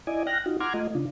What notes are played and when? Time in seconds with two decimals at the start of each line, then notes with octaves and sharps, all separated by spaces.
0.07 E4 D5 D#5 G#5
0.27 G5 F6 F#6 A#6
0.46 D#4 F4 F#4
0.61 F#5 A#5 C6 D6 F6 G#6
0.74 A3 F4 D#5
0.95 C#3 D4 F4